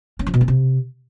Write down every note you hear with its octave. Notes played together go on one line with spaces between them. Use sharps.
C#4
F3
B2
C4
C3